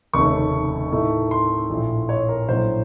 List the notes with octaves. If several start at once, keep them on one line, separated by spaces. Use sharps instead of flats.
F1 D#2 C#3 A3 C#4 C#6
A2 A3 D#4
C6
A#1 A2 F3
C#5
A#4
A#1 A2 F#3 A#3 C#4 C5